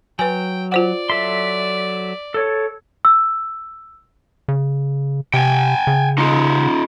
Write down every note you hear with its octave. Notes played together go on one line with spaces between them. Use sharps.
F#3 B4 G5 G#5
F4 C5 D5 F#5
F#3 A4 E5 C6
A4 C#5
E6
C#3
C3 G5 G#5
C#3
D#4 F4